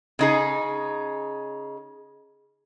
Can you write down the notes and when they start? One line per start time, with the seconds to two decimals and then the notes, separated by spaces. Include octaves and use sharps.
0.19 C#3 D#4 G#4